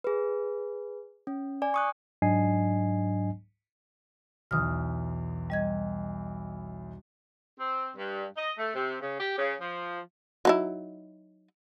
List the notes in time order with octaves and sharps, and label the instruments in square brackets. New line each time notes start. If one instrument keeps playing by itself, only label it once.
[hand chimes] G#4 B4
C#4
D5 G#5
C#6 D#6 F#6
[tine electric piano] G#2 F#3 D4 D#5 G#5 C7
[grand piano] B1 E2 [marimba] D#6 F6
[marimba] G3 D#5 G#6
[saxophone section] C4
G2
D#5
A3
C3
C#3
G4
C#3
F3
[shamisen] F#3 D#4 E4